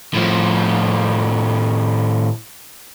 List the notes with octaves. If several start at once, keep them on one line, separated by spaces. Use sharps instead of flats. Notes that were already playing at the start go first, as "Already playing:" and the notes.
A2 F3